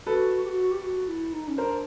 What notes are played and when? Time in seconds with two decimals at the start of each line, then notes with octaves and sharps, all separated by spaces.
0.06 F#4 A4 B4
0.44 G4
0.49 F#4
0.71 G4
0.82 F#4
1.08 E4
1.32 D#4
1.48 C#4
1.58 D4 A#4 C5